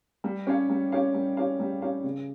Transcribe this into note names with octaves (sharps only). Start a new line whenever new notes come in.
G3
C#4 G4 C#5 F5
G3
C#4 G4 C#5 F5
G3
C#4 G4 C#5 F5
G3
C#4 G4 C#5 F5
C#3